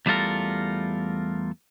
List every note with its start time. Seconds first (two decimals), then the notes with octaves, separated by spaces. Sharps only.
0.06 E2 G3 A3 F4 A4 A#4